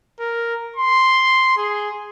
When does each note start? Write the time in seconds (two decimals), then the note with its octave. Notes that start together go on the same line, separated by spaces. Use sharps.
0.20 A#4
0.76 C6
1.57 G#4